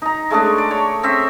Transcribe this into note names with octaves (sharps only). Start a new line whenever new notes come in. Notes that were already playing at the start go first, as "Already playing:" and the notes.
D#4 A#5
G#3 A3 C#4 D4
D5
C#5
C4 C#4 E5